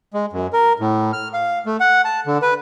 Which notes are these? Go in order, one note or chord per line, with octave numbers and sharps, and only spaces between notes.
G#3
F#2
A#4
A2
F6
F5
A3
F#5
A5
D3
B4